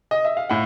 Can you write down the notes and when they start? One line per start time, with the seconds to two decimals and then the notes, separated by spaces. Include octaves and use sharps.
0.11 D#5
0.25 E5
0.37 F5
0.50 A2 F#5